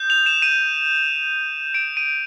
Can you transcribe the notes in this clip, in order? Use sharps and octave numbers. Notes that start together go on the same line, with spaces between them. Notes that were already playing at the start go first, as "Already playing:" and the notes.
Already playing: D#6 G6
F7
E7
D#7
D7
D#7